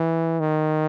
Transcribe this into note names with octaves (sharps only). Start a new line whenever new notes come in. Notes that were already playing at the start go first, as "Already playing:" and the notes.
Already playing: E3
D#3